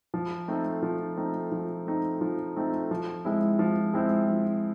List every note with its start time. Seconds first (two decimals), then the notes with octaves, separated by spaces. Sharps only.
0.14 F3
0.48 A3 C4 D#4
0.83 F3
1.17 A3 C4 D#4
1.52 F3
1.86 A3 C4 D#4
2.21 F3
2.56 A3 C4 D#4
2.91 F3
3.25 G#3 C4 E4
3.59 F3
3.94 G#3 C4 E4
4.29 F3